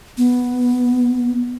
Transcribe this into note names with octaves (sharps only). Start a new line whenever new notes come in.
B3